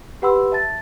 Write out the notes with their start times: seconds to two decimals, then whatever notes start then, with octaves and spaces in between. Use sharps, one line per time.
0.22 G4 B4 F#5 B5 C6 E6
0.52 E5 A5 A6